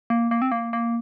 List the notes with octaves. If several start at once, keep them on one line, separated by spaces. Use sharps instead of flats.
A#3
A#3
C4
A#3
A#3